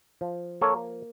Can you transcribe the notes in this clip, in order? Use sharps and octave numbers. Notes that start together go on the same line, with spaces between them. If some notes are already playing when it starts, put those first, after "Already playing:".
F3
A#3 A4 C#5